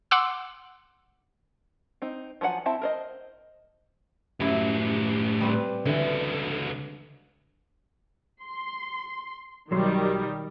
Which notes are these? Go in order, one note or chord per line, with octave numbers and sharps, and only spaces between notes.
F#5 C6 D6 E6
C4 D#4
F3 F#3 D#4 F#5 G#5
C4 E4 E5 A5
A#4 C5 D#5
F#2 A2 E4 G4
G3 C4 B4
C#2 D3 E3 A4
C6
B1 D#3 F#3 G3 C6